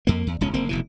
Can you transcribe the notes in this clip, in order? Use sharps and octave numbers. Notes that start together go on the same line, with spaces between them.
F2 A#3
E2
D#1 C#2 C#4
F#1 A#3 C4
F1 B2 E3